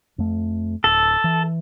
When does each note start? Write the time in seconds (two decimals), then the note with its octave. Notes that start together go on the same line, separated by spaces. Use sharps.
0.18 F2 A3
0.84 D1 A4
1.24 E3